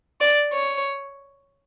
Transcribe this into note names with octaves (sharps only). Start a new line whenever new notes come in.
D5
C#5